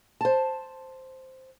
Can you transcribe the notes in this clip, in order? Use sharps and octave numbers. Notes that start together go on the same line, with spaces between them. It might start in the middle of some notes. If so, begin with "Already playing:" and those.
C5 A5